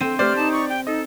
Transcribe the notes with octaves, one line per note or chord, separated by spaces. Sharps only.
C4 A4 G5 D#7
A3 G4 C5 D5 F6
D#4 A5
C#6
G5
D#4 A4 D#5